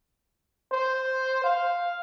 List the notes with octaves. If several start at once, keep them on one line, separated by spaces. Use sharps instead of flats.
C5
F5